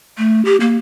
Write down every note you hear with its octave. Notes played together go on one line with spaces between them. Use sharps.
A3
G4
A#3